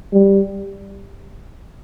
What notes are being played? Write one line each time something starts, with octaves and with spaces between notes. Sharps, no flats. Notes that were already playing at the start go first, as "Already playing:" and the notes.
G3